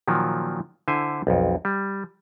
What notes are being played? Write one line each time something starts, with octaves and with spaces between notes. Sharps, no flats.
A#2 D#3 F3 F#3
D3 E4 C5 G#5
B1 F2
G3